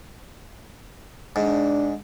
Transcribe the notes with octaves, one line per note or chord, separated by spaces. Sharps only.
G#2 D4